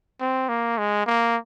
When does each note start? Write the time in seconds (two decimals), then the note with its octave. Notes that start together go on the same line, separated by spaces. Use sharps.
0.21 C4
0.49 A#3
0.78 G#3
1.07 A#3